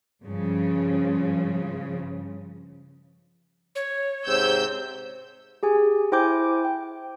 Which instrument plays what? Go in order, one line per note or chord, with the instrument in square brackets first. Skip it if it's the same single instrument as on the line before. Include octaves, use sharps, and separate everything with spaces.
[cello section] G2 C#3 F3
[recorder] C#5
[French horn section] G#2 C3 C5 [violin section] E6 G6
[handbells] G4 G#4 G#5
E4 C5 G5 G#5 D6 G6
G5